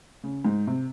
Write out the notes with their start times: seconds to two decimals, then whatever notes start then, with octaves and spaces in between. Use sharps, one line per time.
0.23 C#3
0.44 G#2
0.67 C3